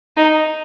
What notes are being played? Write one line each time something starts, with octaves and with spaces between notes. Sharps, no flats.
D#4